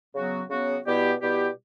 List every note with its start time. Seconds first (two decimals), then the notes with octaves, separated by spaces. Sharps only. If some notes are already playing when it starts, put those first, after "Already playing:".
0.14 C#3 F#3 B3 F#4
0.50 C#3 F#3 B3 F#4
0.86 B2 G3 B3 E4 G4
1.21 B2 G3 B3 E4 G4